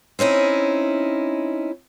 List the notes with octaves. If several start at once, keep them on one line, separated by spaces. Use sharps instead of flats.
C4 C#4 D#4 E4